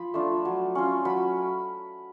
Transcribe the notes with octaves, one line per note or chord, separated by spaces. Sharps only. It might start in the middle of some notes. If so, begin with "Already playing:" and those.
Already playing: F3 B5
A3 D4 F4
F#3
C#4 F4
F#3 B5